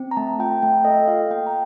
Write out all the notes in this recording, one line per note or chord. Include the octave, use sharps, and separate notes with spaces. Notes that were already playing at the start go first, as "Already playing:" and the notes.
Already playing: C4
A#5
A3 A5
F4 G5
A3 G5
A4 D#5
F4 F5
A#3 G5
A#5